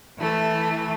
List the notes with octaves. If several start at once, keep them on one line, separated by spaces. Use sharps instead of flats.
E3 A3